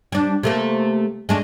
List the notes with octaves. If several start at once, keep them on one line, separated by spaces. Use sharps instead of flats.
G3 D4
C3 A3 A#3
G#3 A3 D4